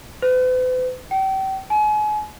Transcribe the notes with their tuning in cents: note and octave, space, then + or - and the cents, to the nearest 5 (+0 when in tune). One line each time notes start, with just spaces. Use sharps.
B4 +45
G5 -35
G#5 +35